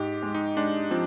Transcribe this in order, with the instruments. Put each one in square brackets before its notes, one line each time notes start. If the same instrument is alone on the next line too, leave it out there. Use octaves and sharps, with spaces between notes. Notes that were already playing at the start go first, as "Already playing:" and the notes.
Already playing: [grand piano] G#2 [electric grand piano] G4
[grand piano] G#3
[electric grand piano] D#4
[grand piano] G#3 [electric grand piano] D4
[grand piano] F3 [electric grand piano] C4